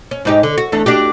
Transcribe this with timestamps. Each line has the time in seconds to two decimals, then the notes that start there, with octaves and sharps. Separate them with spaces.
0.11 C#4
0.25 G#2 D#4 G4
0.43 D3
0.58 F#4
0.72 E2 A3 D4
0.86 D4 F#4 G4